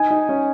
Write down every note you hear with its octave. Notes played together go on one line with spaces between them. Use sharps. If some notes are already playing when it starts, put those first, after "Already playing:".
Already playing: D#4 G#5
D#4
C#4